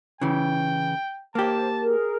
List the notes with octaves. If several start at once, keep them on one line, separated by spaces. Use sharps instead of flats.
C#3 E3 G5
A#3 G4 C5 A5
G#4 A#4